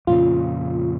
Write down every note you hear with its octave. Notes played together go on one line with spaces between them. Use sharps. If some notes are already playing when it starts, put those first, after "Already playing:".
F2 A#2 C#3 F4